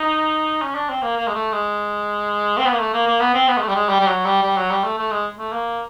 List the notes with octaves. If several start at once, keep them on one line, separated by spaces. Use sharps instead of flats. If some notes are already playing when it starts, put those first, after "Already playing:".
Already playing: D#4
C#4
D4
C4
A#3
A#3
G#3
A3
G#3
C4
B3
A#3
A3
A#3
A#3
B3
C4
B3
G#3
A3
G3
G#3
G3
G3
F#3
G3
G3
F#3
G3
A3
A3
G#3
A3
A#3